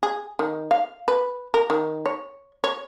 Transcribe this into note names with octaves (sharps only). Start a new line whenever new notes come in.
G#4
D#3
F5
B4
A#4
D#3
C#5
C#5